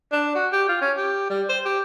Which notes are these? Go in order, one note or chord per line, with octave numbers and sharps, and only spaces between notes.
D4
F#4
G4
F4
C#4
G4
G3
C5
G4